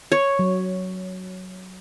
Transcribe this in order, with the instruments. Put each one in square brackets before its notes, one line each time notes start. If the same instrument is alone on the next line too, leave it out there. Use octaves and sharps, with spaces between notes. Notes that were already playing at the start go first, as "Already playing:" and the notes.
[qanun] C#5
[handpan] F#3